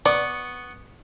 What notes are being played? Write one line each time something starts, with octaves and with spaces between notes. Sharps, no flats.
B3 D5 C#6 D6